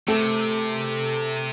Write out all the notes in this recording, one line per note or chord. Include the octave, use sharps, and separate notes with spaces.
C3 A3 A4